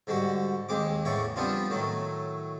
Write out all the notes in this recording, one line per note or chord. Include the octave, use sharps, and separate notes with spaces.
G#2 D3 G3 F#4
D#2 G#3 C4 D6
E2 A2 C#3 E3 D5 C#6
F3 G3 B3 C4 D4 F4
A2 D#3 F#3 A3